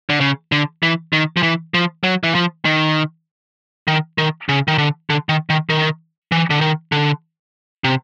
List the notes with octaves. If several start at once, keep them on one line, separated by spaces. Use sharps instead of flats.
D3
C#3
D3
E3
D#3
F3
E3
F3
F#3
E3
F3
D#3
D#3
D#3
C#3
D#3
D3
D3
D#3
D#3
D#3
E3
D3
D#3
D3
C3